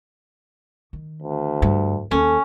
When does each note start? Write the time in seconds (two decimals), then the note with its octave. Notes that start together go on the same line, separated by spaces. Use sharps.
0.93 D#3
1.22 D2
1.62 G2
2.11 D#2 A#3 C#4 A4